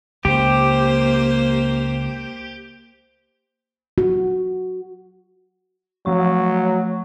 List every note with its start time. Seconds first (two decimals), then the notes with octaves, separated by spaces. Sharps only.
0.25 C#2 A#3 G4 C5
3.98 F#4
6.06 F3 F#3 A3 C#6